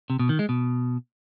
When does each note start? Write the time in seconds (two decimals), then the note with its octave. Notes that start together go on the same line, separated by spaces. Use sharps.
0.10 C3
0.19 B2
0.29 D#3
0.39 G#3
0.49 B2